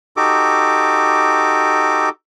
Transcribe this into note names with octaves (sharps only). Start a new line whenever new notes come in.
D#4 F#4 G4 A4 D6